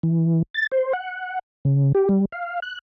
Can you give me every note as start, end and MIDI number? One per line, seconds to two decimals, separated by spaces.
0.03 0.42 52
0.54 0.67 93
0.72 0.93 72
0.93 1.39 78
1.65 1.92 49
1.95 2.09 67
2.09 2.25 55
2.32 2.60 77
2.62 2.78 90